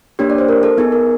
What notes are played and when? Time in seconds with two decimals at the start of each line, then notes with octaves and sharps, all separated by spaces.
0.19 A#3 D4 G4 C#5
0.30 D5
0.38 C5
0.48 A#4
0.63 A4
0.77 B3 D#4 G#4
0.92 A#4